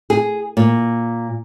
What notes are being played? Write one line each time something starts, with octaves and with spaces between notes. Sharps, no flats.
G#4
A#2